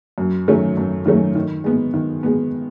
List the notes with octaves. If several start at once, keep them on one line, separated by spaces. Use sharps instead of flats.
F#2
D#3 F#3 A3 C#4
F#2
D#3 F#3 A3 C#4
D#3
G#3 B3
D#3
G#3 B3